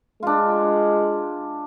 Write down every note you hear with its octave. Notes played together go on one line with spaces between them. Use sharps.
G#3 D4 F4